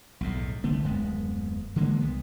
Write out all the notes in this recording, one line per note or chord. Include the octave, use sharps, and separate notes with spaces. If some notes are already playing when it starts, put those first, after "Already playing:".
B1 E2 A2
C2 D3 A3 B3
D#1 F#2 G#3 B3
D3 E3 G#3 A#3
C2 B3